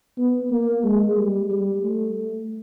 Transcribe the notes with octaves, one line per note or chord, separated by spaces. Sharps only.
B3
A#3
G#3
G3
G3
A3